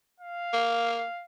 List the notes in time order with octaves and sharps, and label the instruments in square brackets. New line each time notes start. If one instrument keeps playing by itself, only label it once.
[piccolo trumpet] F5
[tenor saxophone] A#3